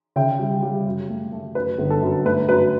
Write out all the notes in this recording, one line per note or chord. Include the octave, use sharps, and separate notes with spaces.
C#3 E5 G5
G3
G3
F#2
A3
A3
F#2 B4
G1
A4
F#2
A3 B4
F#2 B4